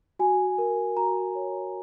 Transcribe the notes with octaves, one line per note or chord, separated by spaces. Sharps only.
F#4 G#5
A#4
F#4 A#5
C#5